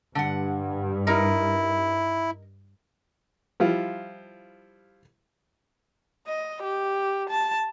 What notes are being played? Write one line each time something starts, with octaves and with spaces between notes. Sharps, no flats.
G2 D3 F#5
D#4 E4 A#4
F3 G3 E4 F4
D#5
G4
A5